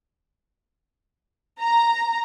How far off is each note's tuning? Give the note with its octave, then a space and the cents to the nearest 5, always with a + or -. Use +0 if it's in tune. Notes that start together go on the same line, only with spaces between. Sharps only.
A#5 +0